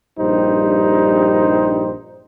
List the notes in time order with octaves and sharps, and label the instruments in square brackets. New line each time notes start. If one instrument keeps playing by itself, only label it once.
[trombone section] A#1 G2 G3 D#4 G4 C5